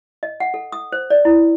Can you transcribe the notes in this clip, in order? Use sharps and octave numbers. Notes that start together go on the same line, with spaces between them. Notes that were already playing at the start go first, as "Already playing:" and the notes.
D#5
F#5
A4
D#6
C5
D5
E4